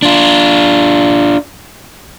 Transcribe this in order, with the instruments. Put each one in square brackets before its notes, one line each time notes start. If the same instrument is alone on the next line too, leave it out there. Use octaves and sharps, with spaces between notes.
[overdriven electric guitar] D4 F4